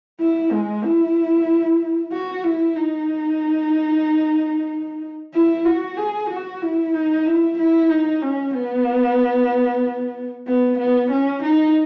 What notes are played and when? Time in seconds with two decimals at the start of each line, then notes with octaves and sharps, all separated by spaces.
0.20 E4
0.52 G#3
0.84 E4
2.12 F#4
2.44 E4
2.76 D#4
5.34 E4
5.65 F#4
5.97 G#4
6.30 F#4
6.62 E4
6.94 D#4
7.26 E4
7.58 E4
7.89 D#4
8.22 C#4
8.54 B3
10.47 B3
10.78 B3
11.11 C#4
11.43 D#4